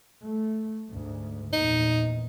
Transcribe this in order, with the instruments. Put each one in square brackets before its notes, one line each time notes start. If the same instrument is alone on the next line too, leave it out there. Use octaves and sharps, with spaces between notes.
[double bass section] A3
D2 G#2
[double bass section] A#1 E2 A#2 [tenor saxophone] D#4